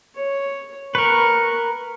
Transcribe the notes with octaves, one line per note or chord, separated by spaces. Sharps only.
C#5
A#4 B4 C#6